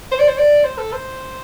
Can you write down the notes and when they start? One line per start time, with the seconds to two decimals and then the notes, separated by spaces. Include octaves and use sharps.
0.12 C5
0.19 D5
0.28 C5
0.38 D5
0.64 C5
0.78 A4
0.92 C5